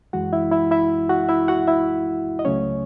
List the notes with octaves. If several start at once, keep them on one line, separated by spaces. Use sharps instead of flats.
F#2 E3 G#3 F#4 F#5
E4 E5
E4 E5
E4 E5
F#4 F#5
E4 E5
F#4 F#5
E4 E5
D#5
C#2 C#3 F#3 A3 C#4 C#5